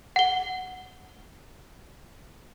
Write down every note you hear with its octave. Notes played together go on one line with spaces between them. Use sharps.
F#5 G7